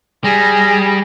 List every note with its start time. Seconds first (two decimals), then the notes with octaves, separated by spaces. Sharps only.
0.24 G3 G#4 A#6